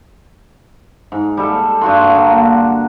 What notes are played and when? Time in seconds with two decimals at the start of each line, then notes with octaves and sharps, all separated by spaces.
1.12 G#2
1.37 G3 A4
1.81 G2 F#4 C6
2.15 D3 A#3